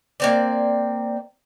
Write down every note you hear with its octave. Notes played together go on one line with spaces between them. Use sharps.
A#3 C4 D5